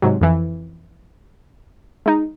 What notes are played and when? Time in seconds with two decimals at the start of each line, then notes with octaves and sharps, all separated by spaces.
0.02 G#2 C3 F#3
0.21 F2 E3
2.06 G#3 D#4